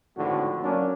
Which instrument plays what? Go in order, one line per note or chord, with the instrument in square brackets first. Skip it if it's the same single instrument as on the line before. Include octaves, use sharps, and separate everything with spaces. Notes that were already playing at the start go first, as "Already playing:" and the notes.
[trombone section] G#1 F2 A2 D3 F#4
F#3 A#3 C#4 D4